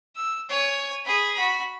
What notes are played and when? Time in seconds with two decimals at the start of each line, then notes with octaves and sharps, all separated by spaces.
0.16 E6
0.49 C#5 G#5
1.05 G#4 B5
1.35 F#4 B5